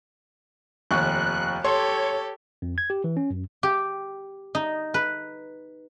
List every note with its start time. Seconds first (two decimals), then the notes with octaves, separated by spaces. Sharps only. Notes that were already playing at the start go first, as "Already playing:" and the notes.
0.91 F1 D#2 C#6 F#6
1.64 G4 A4 C#5 C6
2.62 F2
2.78 G#6
2.90 G4
3.04 E3
3.17 C#4
3.30 F#2
3.63 G4
4.55 D#4
4.94 B4